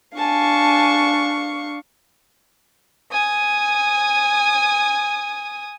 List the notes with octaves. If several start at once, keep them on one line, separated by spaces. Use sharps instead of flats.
D4 F5 G#5 A5 C#6
G#5 D#6